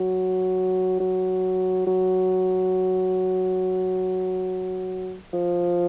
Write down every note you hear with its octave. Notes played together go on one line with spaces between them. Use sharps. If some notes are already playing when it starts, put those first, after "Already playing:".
Already playing: F#3
F#3
F#3
F3